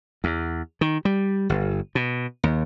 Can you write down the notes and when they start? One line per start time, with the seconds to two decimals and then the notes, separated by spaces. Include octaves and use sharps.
0.24 E2
0.81 D#3
1.05 G3
1.49 G1
1.95 B2
2.44 D#2